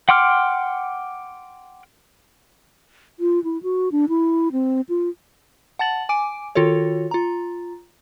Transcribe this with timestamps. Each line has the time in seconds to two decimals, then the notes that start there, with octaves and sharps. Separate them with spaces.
0.09 F#5 G5 C6 D6 F6
3.20 F4
3.44 E4
3.63 F#4
3.92 D4
4.09 E4
4.52 C4
4.89 F4
5.79 F#5 A5 A6 F#7
6.09 G#5 D6 D7
6.55 D#3 F4 F#4 A4 C#5
7.11 F4 A#5